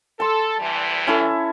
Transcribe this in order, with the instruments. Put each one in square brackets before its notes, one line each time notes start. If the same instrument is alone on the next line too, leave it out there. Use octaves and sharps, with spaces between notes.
[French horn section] A4 [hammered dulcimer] A5 C6
[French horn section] D2 E3 G3
[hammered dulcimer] C#4 E4 A4